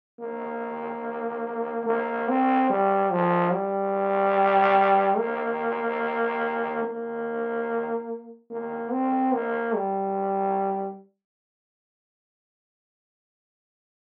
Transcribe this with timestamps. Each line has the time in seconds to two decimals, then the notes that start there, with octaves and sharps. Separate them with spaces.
0.20 A#3
1.87 A#3
2.29 C4
2.70 G3
3.11 F3
3.53 G3
5.18 A#3
6.85 A#3
8.51 A#3
8.92 C4
9.34 A#3
9.75 G3